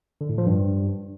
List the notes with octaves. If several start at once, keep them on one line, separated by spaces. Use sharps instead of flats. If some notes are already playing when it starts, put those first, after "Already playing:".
D3
A2
F3
G2